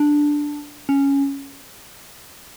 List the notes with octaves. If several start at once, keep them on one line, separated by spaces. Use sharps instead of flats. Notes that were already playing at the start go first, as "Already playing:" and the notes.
Already playing: D4
C#4